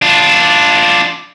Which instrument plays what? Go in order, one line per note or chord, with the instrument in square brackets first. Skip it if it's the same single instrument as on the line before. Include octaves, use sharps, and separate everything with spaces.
[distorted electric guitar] D4 F4